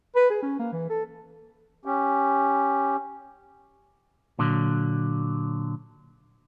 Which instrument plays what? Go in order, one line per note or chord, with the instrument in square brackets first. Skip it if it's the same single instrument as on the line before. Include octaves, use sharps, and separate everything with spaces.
[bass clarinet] B4
G#4
C#4
A#3
E3
A4
[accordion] C#4 G4
[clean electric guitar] A#2 D3 F#3